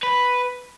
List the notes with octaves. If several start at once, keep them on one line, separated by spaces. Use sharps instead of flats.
B4